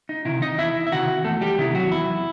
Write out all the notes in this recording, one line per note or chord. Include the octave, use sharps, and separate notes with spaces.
D#4
C3 D#3 E4
D#4 D#5
E2 E4 E5
E5
C3 D#3 F#4 F#5
E2 A3 A4
G3 G4
C3 D#3 E4
F#3 F#4
E2 E4